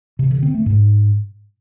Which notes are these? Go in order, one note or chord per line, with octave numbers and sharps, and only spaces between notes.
C3
D3
C4
A3
G#2